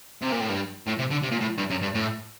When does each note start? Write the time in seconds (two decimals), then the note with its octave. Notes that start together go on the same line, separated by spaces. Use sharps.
0.22 C3
0.32 A#2
0.41 A2
0.49 G2
0.87 A2
0.98 C3
1.11 D3
1.22 C3
1.31 A#2
1.40 A2
1.58 G2
1.70 F#2
1.82 G2
1.94 A2